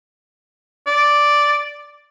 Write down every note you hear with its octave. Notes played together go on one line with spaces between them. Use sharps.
D5